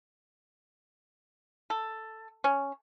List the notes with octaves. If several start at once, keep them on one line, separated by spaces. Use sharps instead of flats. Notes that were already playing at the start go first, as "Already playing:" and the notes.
A4
C#4